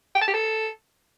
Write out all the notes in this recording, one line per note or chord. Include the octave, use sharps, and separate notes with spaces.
G5
A5
G4
A4